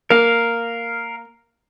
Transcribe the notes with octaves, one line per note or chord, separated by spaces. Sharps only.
A#3 A#4 F5